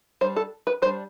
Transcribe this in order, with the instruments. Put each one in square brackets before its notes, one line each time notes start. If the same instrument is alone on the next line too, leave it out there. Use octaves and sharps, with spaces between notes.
[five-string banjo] G3 D4 C5
A4
B4
G3 D4 C5